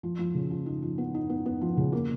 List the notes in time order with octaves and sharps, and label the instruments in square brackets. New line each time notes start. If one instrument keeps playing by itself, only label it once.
[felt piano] F3
F3
C#3
F3
D#4
F3
B3
D#4
B3
B3
F3
C#3
A#3